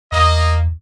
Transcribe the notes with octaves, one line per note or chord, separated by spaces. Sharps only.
E2 A#3 D#5